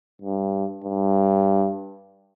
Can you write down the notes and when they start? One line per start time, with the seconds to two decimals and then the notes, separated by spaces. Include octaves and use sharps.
0.22 G2
0.84 G2